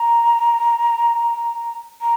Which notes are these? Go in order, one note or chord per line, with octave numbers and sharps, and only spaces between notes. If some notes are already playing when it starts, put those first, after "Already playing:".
Already playing: A#5
A#5